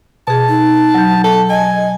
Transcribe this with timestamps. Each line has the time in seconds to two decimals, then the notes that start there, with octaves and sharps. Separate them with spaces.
0.28 B2 G#4 A5
0.49 D#4
0.95 F#3 G6
1.24 A4
1.50 D#5 G#5